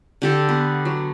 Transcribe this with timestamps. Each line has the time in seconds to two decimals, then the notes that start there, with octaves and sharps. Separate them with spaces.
0.22 D3 G4 A4
0.49 B3
0.85 F#3